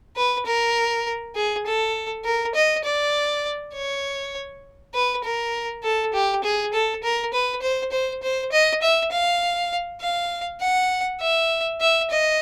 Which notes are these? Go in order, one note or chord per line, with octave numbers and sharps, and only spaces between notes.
B4
A#4
G#4
A4
A#4
D#5
D5
C#5
B4
A#4
A4
G4
G#4
A4
A#4
B4
C5
C5
C5
D#5
E5
F5
F5
F#5
E5
E5
D#5